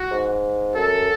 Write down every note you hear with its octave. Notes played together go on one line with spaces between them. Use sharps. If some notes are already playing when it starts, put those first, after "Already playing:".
Already playing: F#4
G#2
F#2 A4